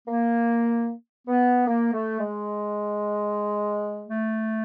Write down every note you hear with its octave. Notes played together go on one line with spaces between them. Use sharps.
A#3
B3
A#3
A3
G#3
A3